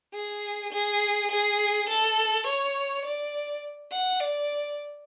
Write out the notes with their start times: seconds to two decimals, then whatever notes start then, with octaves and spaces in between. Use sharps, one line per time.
0.15 G#4
0.73 G#4
1.31 G#4
1.89 A4
2.47 C#5
3.05 D5
3.92 F#5
4.20 D5